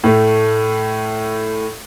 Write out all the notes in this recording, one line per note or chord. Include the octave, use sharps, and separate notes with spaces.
A2 A3